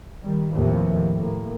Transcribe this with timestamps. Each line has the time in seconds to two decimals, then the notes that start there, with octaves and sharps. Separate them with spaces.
0.23 D#3 G3
0.53 D#2 A2 C3 E3 F3
1.16 A2 A#3